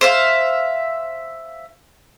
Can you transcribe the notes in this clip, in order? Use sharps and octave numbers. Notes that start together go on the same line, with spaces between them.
C5 E5 F5